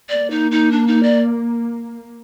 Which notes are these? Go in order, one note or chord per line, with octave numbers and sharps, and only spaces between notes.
A#3 D5
D#4
D#4
D4
D#4
D5